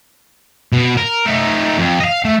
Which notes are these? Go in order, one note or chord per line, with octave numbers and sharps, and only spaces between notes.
B2
A#4
A3 D#4
F2
D#5 F5
A3